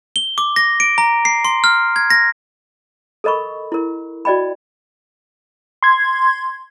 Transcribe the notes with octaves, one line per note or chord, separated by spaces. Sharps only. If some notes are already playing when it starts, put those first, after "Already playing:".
G7
D6
A#6
D7
A#5
C7
C6
F6
G#6
A#6
A4 A#4 D#5 B5 C#6
E4 A#4
F#4 D5 D#5 G5 B5
C6 G#6